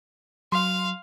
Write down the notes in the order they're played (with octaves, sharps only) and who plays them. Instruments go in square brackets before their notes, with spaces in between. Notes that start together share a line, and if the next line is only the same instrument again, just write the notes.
[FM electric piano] F#3 [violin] F5 [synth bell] C6